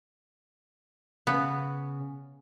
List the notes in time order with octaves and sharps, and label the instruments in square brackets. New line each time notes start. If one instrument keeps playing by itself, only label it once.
[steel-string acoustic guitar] C#3 [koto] B3